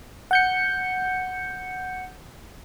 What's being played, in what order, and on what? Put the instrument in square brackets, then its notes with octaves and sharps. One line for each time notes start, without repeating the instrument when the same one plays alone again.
[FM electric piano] F#5 G6 C#7